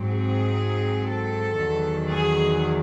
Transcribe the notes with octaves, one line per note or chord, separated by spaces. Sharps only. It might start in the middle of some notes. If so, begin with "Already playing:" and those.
Already playing: G#2 F#3 C4
G#4
A4
E2 D#3 F#3
G#4